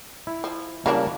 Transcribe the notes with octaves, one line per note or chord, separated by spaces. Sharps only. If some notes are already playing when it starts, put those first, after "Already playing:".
E4
F3
C#3 E3 F#3 G3 A#3 D4